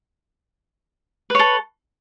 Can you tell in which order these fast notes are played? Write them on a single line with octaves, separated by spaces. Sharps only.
B4 C#5 A4